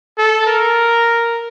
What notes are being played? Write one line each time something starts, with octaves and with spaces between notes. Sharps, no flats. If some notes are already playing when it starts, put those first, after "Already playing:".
A4
A#4